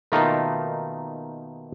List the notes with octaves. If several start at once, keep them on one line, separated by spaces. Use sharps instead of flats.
B2 D#3 A3 A#3 D#4 F4